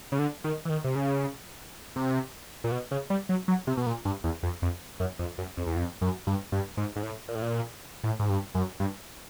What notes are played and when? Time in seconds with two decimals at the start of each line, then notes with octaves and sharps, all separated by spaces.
0.12 C#3
0.19 D3
0.44 D#3
0.65 E3
0.70 D#3
0.84 C3
0.95 C#3
1.96 C3
2.64 A#2
2.72 B2
2.91 C#3
3.10 G3
3.29 F#3
3.48 F#3
3.67 C3
3.77 B2
3.86 A#2
4.05 G2
4.24 E2
4.43 F2
4.62 F2
5.00 F#2
5.19 F2
5.38 F#2
5.57 F2
5.66 E2
5.76 F2
6.01 F#2
6.27 G2
6.52 G2
6.77 G#2
6.96 G#2
7.03 A2
7.28 A#2
7.35 A2
7.42 A#2
8.03 A2
8.19 G#2
8.29 G2
8.55 F#2
8.80 G2